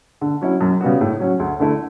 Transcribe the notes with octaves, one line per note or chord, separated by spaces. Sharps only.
D3
F#3 C#4 E4
F#2
C#3 G3 B3 F#4
A2
F#3 C#4
D2
D3 A3 E4